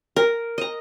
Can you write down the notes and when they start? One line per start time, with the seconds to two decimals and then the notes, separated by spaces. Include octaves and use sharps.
0.16 A#4
0.58 D#5 A#5